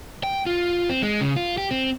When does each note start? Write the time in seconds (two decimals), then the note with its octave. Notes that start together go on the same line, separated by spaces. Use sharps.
0.23 G5
0.46 F4
0.89 C4
1.02 G#3
1.21 C#3
1.36 F4
1.58 G4
1.71 C4